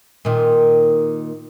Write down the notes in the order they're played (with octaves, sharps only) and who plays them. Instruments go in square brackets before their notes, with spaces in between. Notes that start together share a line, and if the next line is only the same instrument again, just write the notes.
[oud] A#2 D#3